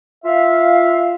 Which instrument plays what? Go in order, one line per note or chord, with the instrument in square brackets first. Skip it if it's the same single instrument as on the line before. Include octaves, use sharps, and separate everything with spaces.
[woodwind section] F4 E5 F5